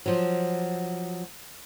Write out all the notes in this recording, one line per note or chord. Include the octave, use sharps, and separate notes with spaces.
F3 F#3